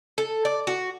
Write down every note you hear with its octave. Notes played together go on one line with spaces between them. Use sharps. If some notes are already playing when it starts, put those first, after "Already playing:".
A4
D5
F#4